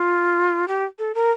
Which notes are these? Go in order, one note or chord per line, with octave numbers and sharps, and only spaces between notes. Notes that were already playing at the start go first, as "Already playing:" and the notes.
Already playing: F4
G4
A4
A#4